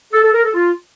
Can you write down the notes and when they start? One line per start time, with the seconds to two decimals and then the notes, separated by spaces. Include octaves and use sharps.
0.12 A4
0.23 A4
0.33 A#4
0.44 A4
0.55 F4